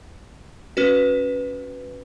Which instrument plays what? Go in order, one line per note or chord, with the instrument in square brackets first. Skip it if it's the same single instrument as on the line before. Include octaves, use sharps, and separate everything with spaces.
[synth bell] C#4 F#4 B4